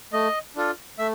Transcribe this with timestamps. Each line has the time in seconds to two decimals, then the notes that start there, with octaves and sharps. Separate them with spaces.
0.13 A3 D#5
0.56 D4 F4 A4
0.99 A3 E5